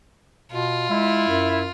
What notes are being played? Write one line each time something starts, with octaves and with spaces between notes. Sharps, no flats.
B2 F4
G#3 E4
F#2